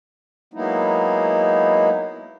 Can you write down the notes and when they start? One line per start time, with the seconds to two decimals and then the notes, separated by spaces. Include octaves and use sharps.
0.54 F#3 G#3 A#3 B3 D#4 E4